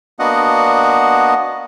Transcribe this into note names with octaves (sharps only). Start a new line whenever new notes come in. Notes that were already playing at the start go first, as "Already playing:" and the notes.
A#3 B3 D4 F#4 D#5 F#5